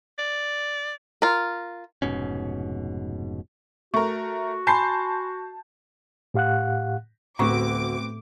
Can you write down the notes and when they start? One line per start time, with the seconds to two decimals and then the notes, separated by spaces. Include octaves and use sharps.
0.18 D5
1.22 F4 A#4
2.02 F1 G#2 B2 C#4
3.94 A3 F#4 A#4 C#6
4.67 G#5 A5 B5 C6 G6 C7
6.34 A2 G4 F5 F#5 F#6
7.39 D2 A2 B3 C4 F#4 C#6 D6